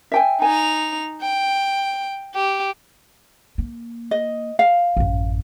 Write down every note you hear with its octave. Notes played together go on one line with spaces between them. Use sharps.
E5 G5 G#5
D#4 G#5 F7
G5
G4
A#3
D#5
F5
A1 F#2